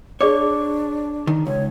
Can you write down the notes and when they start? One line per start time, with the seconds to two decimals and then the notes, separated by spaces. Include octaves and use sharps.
0.21 D4 G#4 C#5 D5 D6
1.27 D#3
1.47 C#2 C#5